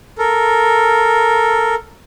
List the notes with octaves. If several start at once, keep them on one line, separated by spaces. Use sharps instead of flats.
A4 A#4